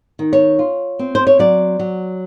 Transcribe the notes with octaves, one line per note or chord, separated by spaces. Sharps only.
D#3
C#5
F4
C4
C5
C#5
F#3 D5
F#3